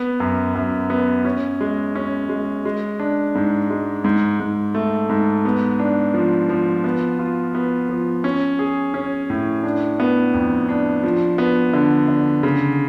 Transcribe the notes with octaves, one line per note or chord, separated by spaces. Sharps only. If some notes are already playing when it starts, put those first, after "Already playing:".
Already playing: B3
F#2
F#2
B3
C#4
G#3
C#4
G#3
G#3
D4
G#2
G#3
G#2
G#2
A3
G#2
B3
D4
F3
F3
B3
F4
B3
F3
C#4
G#4
C#4
A2
D4
B3
F2
D4
F3
B3
D3
D3
C#3